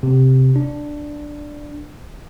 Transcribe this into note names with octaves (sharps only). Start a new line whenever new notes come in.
C3
D4